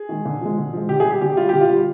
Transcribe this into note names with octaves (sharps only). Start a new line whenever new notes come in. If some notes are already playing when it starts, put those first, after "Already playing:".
Already playing: G#4
D#3 G#3
D3
F3 G#3
D3
F3 G#3
D3 G4
G#4
G3
G4
D3 G4
G3 F4
D3 G4
F4
G3